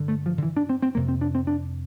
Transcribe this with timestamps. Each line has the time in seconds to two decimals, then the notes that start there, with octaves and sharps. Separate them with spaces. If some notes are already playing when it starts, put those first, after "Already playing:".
Already playing: G2 D3
0.08 A3
0.26 F3
0.38 D3
0.43 E3
0.57 D4
0.69 C4
0.82 C4
0.95 F2 C3 A#3
1.08 C4
1.21 D4
1.35 C4
1.47 D4